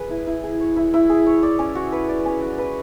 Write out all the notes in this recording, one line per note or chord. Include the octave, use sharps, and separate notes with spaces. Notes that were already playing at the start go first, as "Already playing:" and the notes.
Already playing: G#4 B4
E4
E4
G#4
C#5
E4
E4
G#4
C#5
D5
C#4
F#4
B4
D5
C#4
F#4
B4